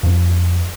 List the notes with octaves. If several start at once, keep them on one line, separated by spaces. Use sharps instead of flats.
F2